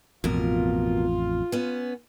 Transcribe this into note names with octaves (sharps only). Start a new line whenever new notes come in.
A1 F2 B2 F4 A#4
B3 C#4